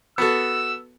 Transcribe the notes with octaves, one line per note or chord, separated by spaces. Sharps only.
B3 F#4 A4 E6